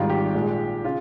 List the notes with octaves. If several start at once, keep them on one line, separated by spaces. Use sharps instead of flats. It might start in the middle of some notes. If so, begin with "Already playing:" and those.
Already playing: G#1 G#2 D#3 G3 F4
G4
A#1 A#2 G#3
C#3 F4